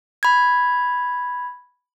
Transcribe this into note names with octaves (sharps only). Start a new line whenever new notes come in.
B5 G#6